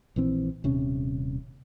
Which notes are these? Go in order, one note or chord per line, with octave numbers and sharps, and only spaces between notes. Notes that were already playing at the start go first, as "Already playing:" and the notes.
A#1 E3 C4
D#1 C3 C#4